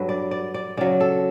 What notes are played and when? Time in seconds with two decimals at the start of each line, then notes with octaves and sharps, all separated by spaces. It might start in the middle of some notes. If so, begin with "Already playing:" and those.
Already playing: G2 F#3 A4 B4
0.09 D5
0.31 D5
0.54 D5
0.77 C#3 F#3 D5
1.00 A4